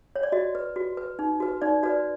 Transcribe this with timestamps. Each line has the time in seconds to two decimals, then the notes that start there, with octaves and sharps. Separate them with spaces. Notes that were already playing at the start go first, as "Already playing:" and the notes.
0.16 C#5
0.23 D5
0.32 F#4 D#5
0.55 B4
0.76 F#4
0.97 B4
1.19 D#4
1.40 F#4 B4
1.62 D#4 D5
1.83 F#4 B4 D5